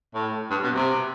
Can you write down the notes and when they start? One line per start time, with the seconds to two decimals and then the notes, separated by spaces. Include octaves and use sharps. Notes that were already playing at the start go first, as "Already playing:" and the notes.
0.15 A2
0.50 G2
0.64 B2
0.75 C3